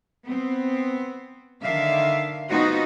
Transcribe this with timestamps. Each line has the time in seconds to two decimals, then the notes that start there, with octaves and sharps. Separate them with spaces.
0.25 B3 C4
1.61 D3 D#3 D4 E5 F5
2.49 B3 C4 D#4 F4 F#4